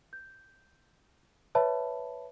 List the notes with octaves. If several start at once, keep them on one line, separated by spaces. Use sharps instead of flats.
G6
B4 C#5 E5 A5 B5